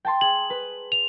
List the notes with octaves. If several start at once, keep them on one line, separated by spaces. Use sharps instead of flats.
G5 A5 C6
G#4 F#7
B4
F7